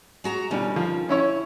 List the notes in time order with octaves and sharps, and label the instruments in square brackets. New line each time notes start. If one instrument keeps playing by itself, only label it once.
[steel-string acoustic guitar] G#3 F#4 A#5
[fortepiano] B2 G3 [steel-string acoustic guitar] D3 D#3 C#4
[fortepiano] F3
C#4 E4 C#5